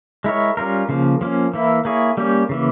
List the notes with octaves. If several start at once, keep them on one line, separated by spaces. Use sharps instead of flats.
G#3 E4 A#4 C#5
G3 C#4 F4 A#4
C#3 F3 A#3
F3 A#3 C#4
E3 A#3 E4
A#3 E4 G#4 C#5
G3 A#3 C#4 G4
C#3 E3 A#3